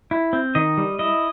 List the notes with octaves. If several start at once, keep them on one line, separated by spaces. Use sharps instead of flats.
E4
C4
D#3 D#5
G3
E4 D#5